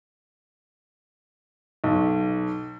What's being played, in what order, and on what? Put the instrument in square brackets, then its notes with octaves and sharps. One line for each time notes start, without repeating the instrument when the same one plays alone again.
[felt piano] B1